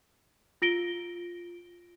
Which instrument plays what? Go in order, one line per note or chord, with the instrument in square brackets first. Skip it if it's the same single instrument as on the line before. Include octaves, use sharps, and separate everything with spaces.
[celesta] F4 A#6 D7 G7